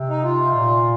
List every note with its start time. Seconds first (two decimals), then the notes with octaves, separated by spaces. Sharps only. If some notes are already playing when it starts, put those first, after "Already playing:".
Already playing: C3
0.09 D#4
0.24 F4
0.54 A#2